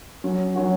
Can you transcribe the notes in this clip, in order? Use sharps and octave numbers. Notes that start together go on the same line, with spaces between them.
F#3 C#4 F#4
F#3 C#4 F#4